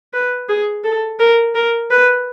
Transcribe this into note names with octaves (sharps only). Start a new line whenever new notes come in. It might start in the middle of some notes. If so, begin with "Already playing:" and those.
B4
G#4
A4
A#4
A#4
B4